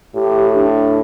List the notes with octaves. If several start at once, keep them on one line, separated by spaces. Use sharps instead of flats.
A2 G4
D4